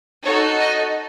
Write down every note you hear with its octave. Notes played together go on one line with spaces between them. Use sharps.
D#4 F#4 A4 C#5
D#5